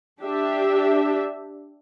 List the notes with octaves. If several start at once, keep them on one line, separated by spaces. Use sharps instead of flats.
D4 G4 E5